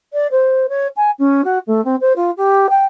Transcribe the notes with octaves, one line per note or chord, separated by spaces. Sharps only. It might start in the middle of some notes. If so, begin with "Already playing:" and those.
D5
C5
C#5
G#5
C#4
F#4
A3
C4
C5
F4
G4
G5